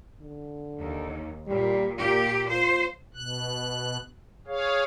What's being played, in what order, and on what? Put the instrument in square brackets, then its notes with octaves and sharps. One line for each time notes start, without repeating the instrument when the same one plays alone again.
[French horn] D3
[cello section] D#2
[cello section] A#2 [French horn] G3
[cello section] A#2 G4 [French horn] F4
[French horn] F4 [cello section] C5
[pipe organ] B2 F#6
G#4 C#5 F5